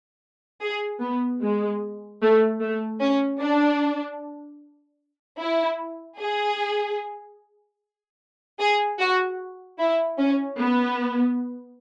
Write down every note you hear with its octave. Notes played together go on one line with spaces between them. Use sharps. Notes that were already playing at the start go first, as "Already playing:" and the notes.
G#4
B3
G#3
A3
A3
C#4
D4
E4
G#4
G#4
F#4
E4
C#4
B3